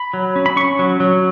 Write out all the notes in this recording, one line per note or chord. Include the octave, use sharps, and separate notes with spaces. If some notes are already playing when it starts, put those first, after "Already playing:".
Already playing: B5
F#3
C#4
B5
C#4 C#6
F#3
F#3